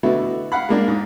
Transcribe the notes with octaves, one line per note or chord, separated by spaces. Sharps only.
B2 D3 A3 B3 E4 F#4
F5 F#5 B5
G#3 A#3 D4
G#2